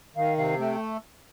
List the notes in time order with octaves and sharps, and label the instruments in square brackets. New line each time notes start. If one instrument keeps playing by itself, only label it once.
[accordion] D#3 [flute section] F5
[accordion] C3 [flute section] F5
[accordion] A3 [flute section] G5